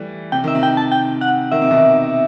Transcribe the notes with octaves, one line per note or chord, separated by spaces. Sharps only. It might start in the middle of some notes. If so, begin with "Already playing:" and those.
Already playing: E3 G3 A3
C3 G5
D#3 E5
C3
G5
A5
G5
F#5
D#3 E5
C3
B2 D#3